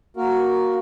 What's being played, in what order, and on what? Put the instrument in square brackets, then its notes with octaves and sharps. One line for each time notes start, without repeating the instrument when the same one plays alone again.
[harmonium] A#3 F#4 A#4